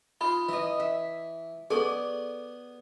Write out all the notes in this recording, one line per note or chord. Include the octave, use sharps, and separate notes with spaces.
D#4 F4 B5
E3 D#5 E5 A#5
E5
B3 G#4 A4 D5 G#5 C#6